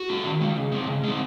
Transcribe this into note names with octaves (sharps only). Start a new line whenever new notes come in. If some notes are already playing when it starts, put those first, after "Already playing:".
Already playing: F#4
G#3 C#4
D#3
G#3 C#4
C#3
G#3 C4
C#3
G#3 C4